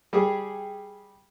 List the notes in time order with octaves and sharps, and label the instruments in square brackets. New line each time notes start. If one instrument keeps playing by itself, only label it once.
[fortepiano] G3 G4 G#4